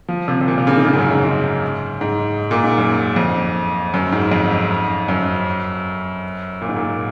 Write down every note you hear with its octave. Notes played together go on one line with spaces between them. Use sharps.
F3
C3
C3
A#2
C3
C#3
D#3
C#3
G#2
F#2
G#2
G#2
G#2
A#2
G#2
F#2
F2
F#2
G#2
F2
F#2
A#2
G#2
A#2